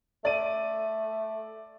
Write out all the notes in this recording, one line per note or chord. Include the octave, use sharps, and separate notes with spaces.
A3 D5 D#7